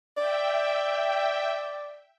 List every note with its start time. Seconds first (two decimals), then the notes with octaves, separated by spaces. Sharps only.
0.17 D5 E5 G5